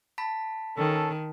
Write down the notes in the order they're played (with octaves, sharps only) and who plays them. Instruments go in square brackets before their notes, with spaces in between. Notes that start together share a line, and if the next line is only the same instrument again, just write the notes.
[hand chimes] A5 B5 B6
[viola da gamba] D#3 [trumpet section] C#4 A4